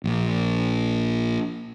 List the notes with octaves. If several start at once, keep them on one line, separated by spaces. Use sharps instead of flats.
A#1 A#2